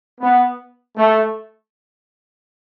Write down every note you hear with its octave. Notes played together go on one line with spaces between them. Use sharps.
B3
A3